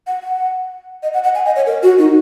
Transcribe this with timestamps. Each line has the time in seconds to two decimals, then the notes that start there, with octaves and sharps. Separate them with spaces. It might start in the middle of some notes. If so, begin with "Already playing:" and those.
0.07 F#5
0.23 F#5
1.03 D#5
1.14 F#5
1.24 F#5
1.35 G#5
1.45 D#5
1.56 C#5
1.66 A#4
1.83 F#4
1.98 D#4